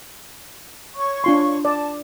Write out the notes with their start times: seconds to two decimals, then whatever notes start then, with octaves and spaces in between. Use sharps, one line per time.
0.96 C#5 C#6
1.24 D4 F4 C6
1.65 D5 A5